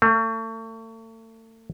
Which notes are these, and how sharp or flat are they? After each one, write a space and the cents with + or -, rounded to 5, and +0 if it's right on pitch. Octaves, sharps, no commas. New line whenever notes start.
A3 +40